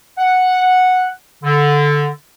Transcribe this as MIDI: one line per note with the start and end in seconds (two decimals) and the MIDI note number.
0.18 1.08 78
1.44 2.06 50